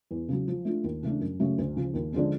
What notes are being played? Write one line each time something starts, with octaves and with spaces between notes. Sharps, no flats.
E2
C#3 F#3
F3
A3 D4 F4
D#2
C#3 E3 A3 D4
F#2
C#3 F#3 A3 C#4
D2
C#3 F3
D#2
D3 F3 G#3 C#4